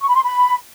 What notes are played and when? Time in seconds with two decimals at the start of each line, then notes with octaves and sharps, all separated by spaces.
0.01 C#6
0.08 B5
0.15 C6
0.22 B5